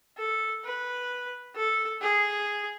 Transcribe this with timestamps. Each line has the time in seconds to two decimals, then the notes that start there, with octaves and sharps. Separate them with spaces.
0.18 A4
0.64 B4
1.56 A4
2.01 G#4